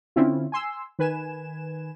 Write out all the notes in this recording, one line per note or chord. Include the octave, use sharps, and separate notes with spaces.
D3 C4 C#4 E4 F4
G#5 C6 E6
D#3 B4 G#5 E7